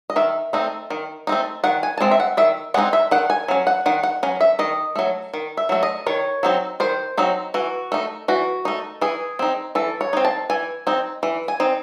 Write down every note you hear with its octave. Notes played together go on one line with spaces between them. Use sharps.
D#5
D#3 E5
A3 C4 D#4
D#3
A3 C4 D#4
D#3 F#5
G#5
A5
G#3 C4 D#4
E5
F#5
D#3 E5
G#3 C4 D#4 F#5
E5
D#3 F#5
G#5
F#3 C#4
F#5
D#3 F#5
F#5
F#3 C#4
E5
D#3 D#5
F#3 A3
D#3
E5
F#3 A3
D#5
D#3 C#5
F#3 C4 D#4
D#3 C5
F#3 C4 D#4
E3 F#4
A3 D#4
E3 F#4
A3 D#4
E3 G#4
C4 D#4
E3 A4
C#5
C4 D#4
A5
E3 G#5
C4 D#4
E3
G#5
C4 D#4